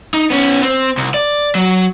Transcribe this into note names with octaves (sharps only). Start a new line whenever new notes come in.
D#4
B3 C#4
C4
C2
D5
F#3